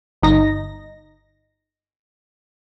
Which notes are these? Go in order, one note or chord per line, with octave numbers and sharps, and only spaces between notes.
G1 D#4 A#6